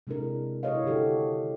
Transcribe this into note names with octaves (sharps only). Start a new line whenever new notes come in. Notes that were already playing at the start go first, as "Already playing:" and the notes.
C3 G#3 D4 E4 A#4
E4 F#4 C#5 D#5 F5
D3 D#3 F#4 G4 A4